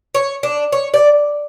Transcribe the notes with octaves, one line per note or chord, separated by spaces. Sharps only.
C#5
D4
C#5
D5